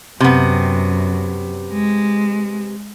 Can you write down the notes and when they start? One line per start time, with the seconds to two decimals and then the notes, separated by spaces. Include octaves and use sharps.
0.20 F#2 C3 B3
1.73 G#3